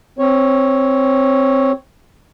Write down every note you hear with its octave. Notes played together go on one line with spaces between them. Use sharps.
C4 C#5